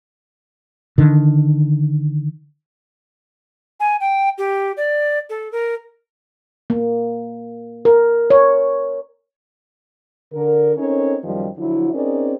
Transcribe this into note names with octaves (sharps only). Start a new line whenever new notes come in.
D3 D#3
G#5
G5
G4
D5
A4
A#4
A#3
A#4
C#5
D3 A#4
C4 C#4 D#4 A4 A#4 C#5
F#2 D#3 F3 G3
D3 F3 F#3 E4
C4 C#4 D#4 G#4 A#4 D5